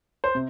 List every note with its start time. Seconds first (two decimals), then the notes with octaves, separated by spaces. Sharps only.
0.24 C5
0.35 C3